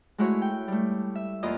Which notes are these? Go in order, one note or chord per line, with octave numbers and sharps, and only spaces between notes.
G#3 A3 E4 F#4 C#5
G5
G3 A3
E5
E2 A#3 F4 D#5 F5 D#6